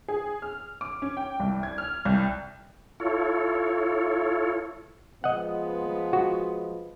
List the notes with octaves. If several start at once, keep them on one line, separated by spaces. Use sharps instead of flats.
G#4
F6
D6
C#4
G5
C2
G#6
F6
C2
E4 F4 A4 C#5
F3 G#3 B3 D#5 F#5
F#4